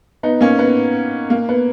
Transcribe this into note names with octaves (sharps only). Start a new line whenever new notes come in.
B3 D#4
A#3 C#4
B3
A#3
B3